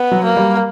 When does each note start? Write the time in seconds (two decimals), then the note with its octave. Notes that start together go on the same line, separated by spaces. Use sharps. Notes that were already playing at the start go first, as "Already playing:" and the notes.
Already playing: B3
0.11 F#3
0.24 A#3
0.37 G3